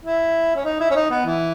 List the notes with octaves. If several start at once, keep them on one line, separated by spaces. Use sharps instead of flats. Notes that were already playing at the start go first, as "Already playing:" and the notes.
E4
C#4
D#4
E4
C#4
D#4
B3
E3